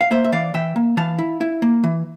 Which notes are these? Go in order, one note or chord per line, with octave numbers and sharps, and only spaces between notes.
F5
A#3 C5 E5
E5
E3 D5 F5
E3 E5 G5
A#3
E3 F5 A5
E4
E4
A#3
E3